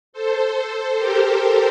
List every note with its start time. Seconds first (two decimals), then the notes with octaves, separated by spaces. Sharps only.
0.13 A4 C5
0.97 G4 A#4
1.40 G4 A#4